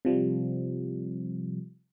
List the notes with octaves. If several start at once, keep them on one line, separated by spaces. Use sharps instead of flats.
C3 F3 G3